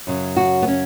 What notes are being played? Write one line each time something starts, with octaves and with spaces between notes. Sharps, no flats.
F#2 C#3 F#3
F#4
B3
C#4